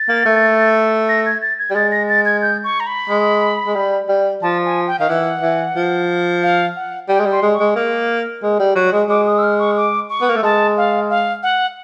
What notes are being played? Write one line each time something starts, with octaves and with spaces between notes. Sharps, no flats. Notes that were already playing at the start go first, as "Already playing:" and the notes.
Already playing: A6
A#3
A3
A#6
G#6
A6
G#6
G3
G#3 A6
A#6
A6
G#6
G6
C#6
A#5
B5
G#3
G#3
G3
G3
F3 A5
G#5
G5
D#3 F5
E3 F#5
E3
F3
F5
F#5
G3 G5
G#3
G3
C6
G#3
C#6
G#3
A#3
G#3
G3
F#3
G#3
G#3 D6
D#6
E6
F6
C#6
D6
C#6
B3
A#3
A3
G#3 A5
F5
F5
F#5